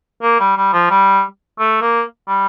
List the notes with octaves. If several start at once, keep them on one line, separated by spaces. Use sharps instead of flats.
A#3
G3
G3
F3
G3
A3
A#3
G3